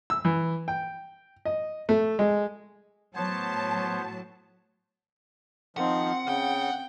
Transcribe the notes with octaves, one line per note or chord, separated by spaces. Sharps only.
E6
E3
G5
D#5
A3
G#3
A2 F#3 B3 C5 C#5 A5
D#3 F3 C4 F#5
C#3 G5